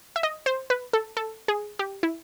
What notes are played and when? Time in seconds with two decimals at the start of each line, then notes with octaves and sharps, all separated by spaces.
0.16 E5
0.23 D#5
0.46 C5
0.70 B4
0.93 A4
1.17 A4
1.48 G#4
1.79 G4
2.03 E4